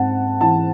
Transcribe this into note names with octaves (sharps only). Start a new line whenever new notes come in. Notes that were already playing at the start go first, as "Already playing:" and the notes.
Already playing: G#2 C4 F#5 A5
E3 A5